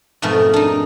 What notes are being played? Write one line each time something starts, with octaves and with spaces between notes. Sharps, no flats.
F2 G#2 B2 A3 A#4 D#5
D4 D#4